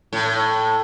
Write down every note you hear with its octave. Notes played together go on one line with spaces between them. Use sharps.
A2